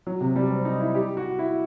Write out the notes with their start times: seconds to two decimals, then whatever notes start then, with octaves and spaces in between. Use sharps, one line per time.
0.07 F#3
0.21 C3
0.36 G3
0.51 C4
0.65 D#4
0.80 E4
0.95 G4
1.17 F#4
1.39 E4